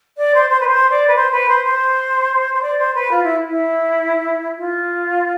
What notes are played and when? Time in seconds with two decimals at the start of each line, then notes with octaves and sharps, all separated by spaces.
0.17 D5
0.34 C5
0.50 C5
0.60 B4
0.67 C5
0.90 D5
1.07 B4
1.16 C5
1.31 B4
1.48 C5
1.65 C5
2.54 C5
2.62 D5
2.78 C5
2.94 B4
3.11 F4
3.23 E4
3.49 E4
4.58 F4